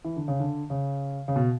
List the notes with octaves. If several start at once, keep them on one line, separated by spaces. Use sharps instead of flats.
E3
D3
C#3
D3
C#3
C#3
B2